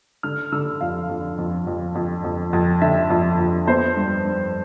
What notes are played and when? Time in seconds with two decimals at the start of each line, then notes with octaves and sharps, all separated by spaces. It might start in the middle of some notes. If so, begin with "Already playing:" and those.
0.23 D3 F6
0.52 D3 E6
0.81 F2 F5
1.09 F2
1.38 F2
1.67 F2
1.95 F2
2.24 F2
2.53 F2
2.81 D3 E5
3.10 F2
3.39 F2
3.67 B3 C5
3.96 G2
4.25 G2